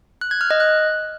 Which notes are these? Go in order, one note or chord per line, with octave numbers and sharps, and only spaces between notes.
F#6
G#6
F6
D#5
F#6